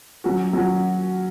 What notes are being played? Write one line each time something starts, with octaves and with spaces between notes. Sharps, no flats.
F#3 C#4 F#4
F#3 C#4 F#4